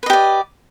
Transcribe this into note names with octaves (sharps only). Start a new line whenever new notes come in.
G4 B4 D5 D#5